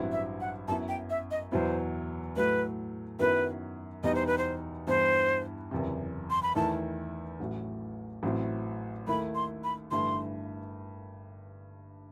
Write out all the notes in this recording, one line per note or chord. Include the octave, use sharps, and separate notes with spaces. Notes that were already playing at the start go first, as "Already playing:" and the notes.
Already playing: A1 G2 F#3 C4 E4
E5
F#5
F#2 F#3 B3 E4 A5
G5
E5
D#5
E2 B2 F#3 B3 E4 C5
A2 F#3 A3 B4
F#2 D#3 F#3 B3 E4 B4
E2 B2 G3 B3 D#4 D#5
C5
B4
C5
G2 E3 B3 E4 C5
F#1 E2 C3
C6
B5
E2 D#3 A3 E4 A5
A1 A2 F#3
A1 A2 F#3 C4 E4
D#2 D#3 A3 E4 B5
C6
B5
G1 G2 E3 A3 C6